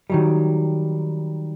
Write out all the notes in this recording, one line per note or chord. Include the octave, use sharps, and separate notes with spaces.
D#3 F#3 G3